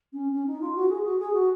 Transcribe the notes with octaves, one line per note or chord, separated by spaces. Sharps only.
C#4
C#4
D#4
F4
F#4
G#4
F#4
G#4
F#4